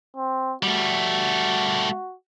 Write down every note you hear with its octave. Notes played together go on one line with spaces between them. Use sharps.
C4
G3 A3 F#4